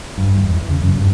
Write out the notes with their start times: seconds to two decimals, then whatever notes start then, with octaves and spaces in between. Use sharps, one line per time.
0.18 G2
0.36 E2
0.54 E2
0.70 C#3
0.81 F#2
0.95 G2